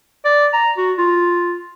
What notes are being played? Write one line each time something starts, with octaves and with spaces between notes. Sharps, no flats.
D5
A#5
F#4
F4